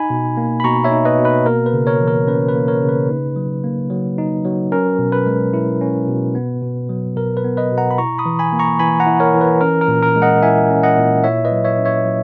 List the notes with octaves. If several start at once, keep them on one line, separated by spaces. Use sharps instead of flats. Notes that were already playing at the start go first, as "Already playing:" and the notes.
Already playing: D#4 G#5 B5
B2
A#3
B5
B2 A#5 C#6
C#5 E5
D#4
B4 D#5
B2
B4
A#3 A#4
B4
C#3
A#4 C#5
E3
A#4
C#4 B4
B4
A#3
A#4 C#5
C#3
B4
D#4
F#3
A#3
F#3
D#4
F#3
C#4 A#4
B2
B4
G#3
E4
C#4
B2
B3
B2
F#3
B2 A#4
B4
B3
B4 D#5
B2
F#5 A#5
B5
E4 A#5 C#6
B5 D#6
E3
G#5 B5
A#3
A#5 C#6
E3 G#5 B5
F#5 A#5
E4
A#4 C#5
E3
B4
C#4 A#4
A#4
A#2
A#4
G#3
D#5 F#5
E4 E5 G#5
C#4
D#5 F#5
A#2
E4 C#5 E5
B4 D#5
F#3
C#5 E5
C#4
C#5 E5
F#3